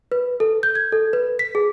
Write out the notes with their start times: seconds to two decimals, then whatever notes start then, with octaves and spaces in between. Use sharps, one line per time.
0.12 B4
0.40 A4
0.63 G6
0.75 G#6
0.92 A4
1.13 B4
1.39 B6
1.55 G#4